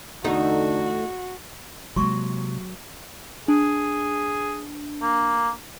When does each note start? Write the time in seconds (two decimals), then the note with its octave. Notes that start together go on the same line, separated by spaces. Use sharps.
0.24 E2 D3 A3 D#4 F#4
1.96 C3 F#3 G#3 A#3 C6 C#6
3.48 D4 G#4
5.02 A#3